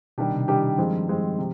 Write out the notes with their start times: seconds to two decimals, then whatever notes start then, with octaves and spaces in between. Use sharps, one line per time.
0.18 B2 D#3 G3 D4 G4
0.34 C3
0.48 D#3 G3 D4 G4
0.78 G2 D#3 F3 G#3 C4
1.08 G2 D#3 G#3 C4
1.38 C3